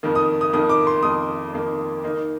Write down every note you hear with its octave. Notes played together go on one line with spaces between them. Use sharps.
F2 D#3 A#3
D#6
D#6
F2 D#3 A#3 D#6
D6
C6
F2 D#3 A#3 D#6
F2 D#3 A#3
D#3 A#3 D#4